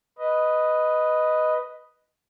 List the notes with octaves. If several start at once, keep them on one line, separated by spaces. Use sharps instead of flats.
B4 D#5